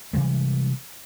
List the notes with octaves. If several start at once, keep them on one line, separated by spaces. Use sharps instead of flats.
C3 E3 G3 G#3